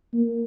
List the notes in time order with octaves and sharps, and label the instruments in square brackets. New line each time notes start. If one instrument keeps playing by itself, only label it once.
[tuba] A#3